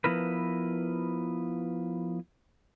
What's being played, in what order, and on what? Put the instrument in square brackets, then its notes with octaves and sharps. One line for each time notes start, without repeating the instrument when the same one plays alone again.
[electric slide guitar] F3 B3 E4 A#4 B4